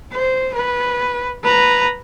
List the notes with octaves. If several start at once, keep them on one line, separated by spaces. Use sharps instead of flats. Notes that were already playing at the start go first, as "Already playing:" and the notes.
C5
B4
B4 A#5